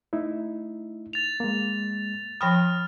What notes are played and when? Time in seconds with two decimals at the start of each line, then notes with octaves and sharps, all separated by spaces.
0.13 A3 D#4 E4
1.13 A6 F7
1.40 G#3 A#3
2.41 F3 G5 B5 D#6 F6